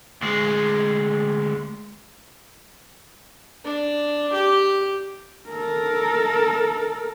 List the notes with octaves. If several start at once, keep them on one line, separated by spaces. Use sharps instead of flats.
D2 G#3
D4
G4
A4 A#4